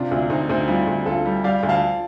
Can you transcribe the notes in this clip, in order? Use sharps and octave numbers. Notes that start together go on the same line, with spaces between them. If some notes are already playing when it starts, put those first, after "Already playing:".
Already playing: C3 D4 F4
D2 D4 F4
D2 C4 D#4
D2 C4 D#4
G3 D4 F4
D2
D2 F4 A4
G3
G3 D5 F5
D2
F5 A5